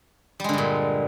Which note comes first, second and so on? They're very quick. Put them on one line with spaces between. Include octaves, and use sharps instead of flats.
G3 G#3 D3 G2 A#2